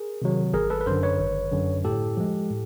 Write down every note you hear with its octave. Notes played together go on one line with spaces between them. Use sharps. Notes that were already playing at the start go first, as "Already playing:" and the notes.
Already playing: G#4 A#4
C3 D#3 F#3
G#1 G#4 A#4
A4 B4
B4
F#2 D3 A#4 C5
B4 C#5
G#1
F#2 D3
A2 G4 A4
F3 G#3
A2